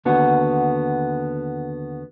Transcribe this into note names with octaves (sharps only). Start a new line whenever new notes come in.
D#2 D3 B3 F#4